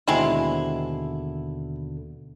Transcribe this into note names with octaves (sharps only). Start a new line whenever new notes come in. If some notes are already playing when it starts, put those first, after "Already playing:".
D#2 B2 D3 G#3 C4 E4